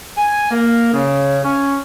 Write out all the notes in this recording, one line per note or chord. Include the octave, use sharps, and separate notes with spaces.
G#5
A#3
C#3
C#4